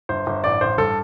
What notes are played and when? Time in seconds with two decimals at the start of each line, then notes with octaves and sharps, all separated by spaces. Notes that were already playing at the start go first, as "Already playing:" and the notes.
0.09 G1 C5
0.27 G1
0.44 A1 D5
0.61 A1 C5
0.78 G2 A4